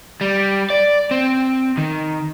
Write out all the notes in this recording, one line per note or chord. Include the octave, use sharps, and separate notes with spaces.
G3
D5
C4
D#3